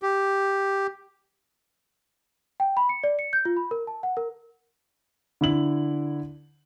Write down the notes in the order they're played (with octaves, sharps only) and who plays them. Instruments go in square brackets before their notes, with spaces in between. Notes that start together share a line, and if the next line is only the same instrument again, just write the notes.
[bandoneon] G4
[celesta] G5
B5
C#7
D5
C#7
G6
F4
B5
A#4
A5
F#5
A#4
[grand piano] D3 E4 F#7